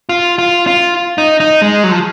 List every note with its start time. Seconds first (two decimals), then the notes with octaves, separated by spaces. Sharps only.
0.09 F4
0.39 F4
0.67 F4
1.18 D#4
1.40 D#4
1.62 G#3
1.84 F#3
1.91 F3